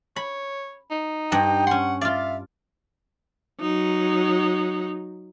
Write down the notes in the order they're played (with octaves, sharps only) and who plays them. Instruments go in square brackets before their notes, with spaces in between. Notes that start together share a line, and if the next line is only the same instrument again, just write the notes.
[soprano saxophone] C#5 [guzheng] B5
[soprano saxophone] D#4
[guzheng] G2 F#5 [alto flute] G5
[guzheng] C#4 C6 [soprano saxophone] F#5
[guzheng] F4 D5 [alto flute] E5 [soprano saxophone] F5
[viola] F#3 D#4